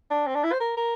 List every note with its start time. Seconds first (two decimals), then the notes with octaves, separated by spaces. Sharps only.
0.10 D4
0.27 C4
0.35 D4
0.44 E4
0.52 C5
0.60 A#4
0.77 A#4